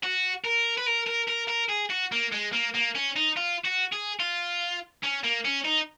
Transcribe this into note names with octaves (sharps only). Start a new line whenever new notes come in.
F#4
A#4
B4
A#4
A#4
A#4
A#4
G#4
F#4
A#3
G#3
A#3
A#3
C#4
D#4
F4
F#4
G#4
F4
C#4
A#3
C#4
D#4